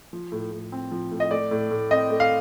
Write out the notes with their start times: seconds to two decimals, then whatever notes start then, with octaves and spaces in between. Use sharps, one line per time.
0.13 F3
0.32 A2
0.52 A2
0.72 C4
0.91 F3
1.11 A2
1.20 D#5
1.31 A3 D5
1.51 A2
1.71 A2
1.91 C4 D#5
2.10 A3
2.20 F5